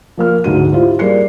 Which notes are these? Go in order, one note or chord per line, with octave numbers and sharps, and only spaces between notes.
F3 A#3 F6
D2 G#2 F#4 D#7
E4 F4 G4 C5
G3 A#3 G#4 D5 C7 C#7